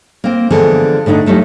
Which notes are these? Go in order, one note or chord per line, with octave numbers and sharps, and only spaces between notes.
A#3 C4
D3 E3 F3 G#3 B3 G#4
A2 D3 D4 D#4
F#3 G3 A3 D#4